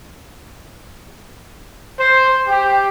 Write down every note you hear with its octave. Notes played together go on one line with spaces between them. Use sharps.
C5
G4